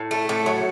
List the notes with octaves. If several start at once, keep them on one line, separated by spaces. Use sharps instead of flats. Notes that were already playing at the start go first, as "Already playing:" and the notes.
Already playing: A2
A3
A2
F#3